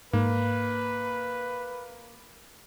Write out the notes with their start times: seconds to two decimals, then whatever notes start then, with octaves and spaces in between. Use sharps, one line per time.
0.13 G#2 A#3 B4